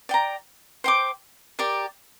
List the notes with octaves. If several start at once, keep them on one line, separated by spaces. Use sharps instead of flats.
D5 G5 A#5
C5 G5 D6
G4 A#4 D5